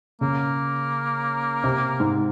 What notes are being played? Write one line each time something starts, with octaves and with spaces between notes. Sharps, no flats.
C#3 A#3
C3
G#2